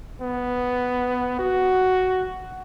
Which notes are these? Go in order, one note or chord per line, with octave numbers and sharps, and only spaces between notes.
B3
F#4